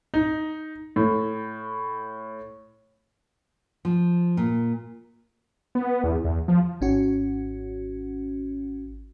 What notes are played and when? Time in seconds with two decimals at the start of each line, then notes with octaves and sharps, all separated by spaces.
0.14 D#4
0.96 A2
3.85 F3
4.37 A#2
5.75 B3
6.04 E2
6.25 E2
6.48 F3
6.81 G#1 C#4 F#4